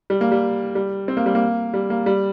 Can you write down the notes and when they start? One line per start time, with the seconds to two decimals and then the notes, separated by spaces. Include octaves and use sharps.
0.10 G3
0.21 A#3
0.32 G3
0.75 G3
1.08 C4
1.17 A#3
1.26 G3
1.35 A#3
1.74 G3
1.90 A#3
2.06 G3